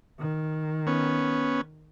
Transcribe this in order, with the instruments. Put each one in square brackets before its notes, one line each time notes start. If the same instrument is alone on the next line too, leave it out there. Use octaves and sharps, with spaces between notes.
[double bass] D#3
[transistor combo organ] B3 C#4